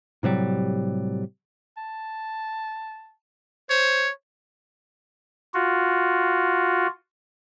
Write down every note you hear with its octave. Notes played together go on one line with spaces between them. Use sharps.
A2 C3 F#3 G3
A5
C5 C#5
F4 F#4